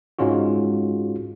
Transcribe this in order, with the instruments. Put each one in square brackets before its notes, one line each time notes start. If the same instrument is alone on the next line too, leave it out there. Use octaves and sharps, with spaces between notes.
[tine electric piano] G#2 G#3 C#4 F4 F#4